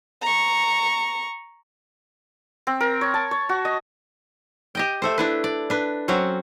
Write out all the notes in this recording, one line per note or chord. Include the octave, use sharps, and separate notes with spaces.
A#5 C#6
C4
A#4
C#5
A5
C#5
F#4
D#5
G4 D#5 G5
A3 A4 C5
D4 E4 B4
D5
D4 B4
F#3 C4 C#4 F#4